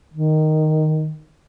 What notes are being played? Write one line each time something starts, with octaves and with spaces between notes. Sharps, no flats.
D#3